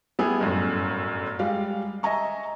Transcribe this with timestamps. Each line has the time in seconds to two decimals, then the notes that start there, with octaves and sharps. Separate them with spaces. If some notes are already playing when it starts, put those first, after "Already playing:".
0.19 G3 A3 B3 E4 G#4
0.40 G1 F#2 A2
1.39 G3 G#3 F5
2.03 D#5 E5 G#5 A#5 C#6